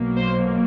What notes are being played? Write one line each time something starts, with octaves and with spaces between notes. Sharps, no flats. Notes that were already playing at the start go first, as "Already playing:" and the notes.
Already playing: B1 B2 F#3 A#3
C5